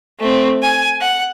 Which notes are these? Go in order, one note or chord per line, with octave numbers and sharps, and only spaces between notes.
A3 C4
G#5
F#5